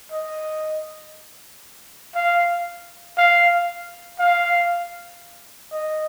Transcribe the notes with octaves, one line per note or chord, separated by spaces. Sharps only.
D#5
F5
F5
F5
D#5